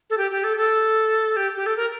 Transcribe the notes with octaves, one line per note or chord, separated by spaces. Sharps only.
A4
G4
G4
A4
A4
G4
G4
A4
A#4